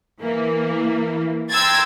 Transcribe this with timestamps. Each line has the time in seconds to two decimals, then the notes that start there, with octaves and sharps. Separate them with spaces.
0.21 E3 A#3
1.50 G5 A#5 C6 E6 G#6 A6